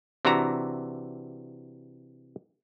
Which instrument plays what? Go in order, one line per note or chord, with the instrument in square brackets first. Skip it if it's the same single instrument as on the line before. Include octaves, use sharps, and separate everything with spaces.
[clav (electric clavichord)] C3 E3 D4 F#4 A#5